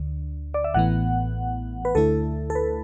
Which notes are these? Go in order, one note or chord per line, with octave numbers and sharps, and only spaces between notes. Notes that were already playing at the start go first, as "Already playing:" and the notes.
Already playing: D2 D3
D5
E5
A1 A2 E3 B3 F#5
B4
D2 D3 A3 E4 A4
A4
B4